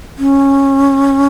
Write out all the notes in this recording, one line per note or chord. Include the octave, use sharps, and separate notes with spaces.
C#4